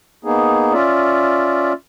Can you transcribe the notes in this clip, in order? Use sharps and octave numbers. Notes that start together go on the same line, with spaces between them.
A#3 B3 D#4 G#4
C#4 F4 D5 E5